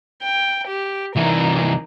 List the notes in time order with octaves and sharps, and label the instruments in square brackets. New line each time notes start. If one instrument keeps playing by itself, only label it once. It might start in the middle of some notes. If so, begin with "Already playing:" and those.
[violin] G5
G4
[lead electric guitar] C2 E3 [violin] D#4 A#4